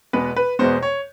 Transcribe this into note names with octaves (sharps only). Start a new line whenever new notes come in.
E2 B2 G#3 B3 B4
B4
E2 B2 G#3 B3 C5
C#5